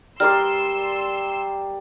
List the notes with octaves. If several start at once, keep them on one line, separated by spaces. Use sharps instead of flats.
G3 A#4 D5 C6 E6 F6